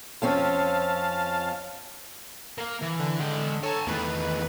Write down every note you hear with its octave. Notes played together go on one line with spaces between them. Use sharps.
F2 C4 C#4 F5 A5
A#3 F5
E3
D3
G#3 G5
A4 C#5 G#5 A5
E2 A2 D#3 B4